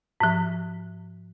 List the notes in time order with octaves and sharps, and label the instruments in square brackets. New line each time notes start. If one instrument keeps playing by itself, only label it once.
[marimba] G#2 F3